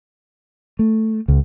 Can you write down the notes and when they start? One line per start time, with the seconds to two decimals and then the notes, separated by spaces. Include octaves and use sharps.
0.79 A3
1.28 C#2